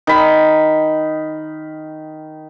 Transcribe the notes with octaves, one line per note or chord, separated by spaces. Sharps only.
D#3 B5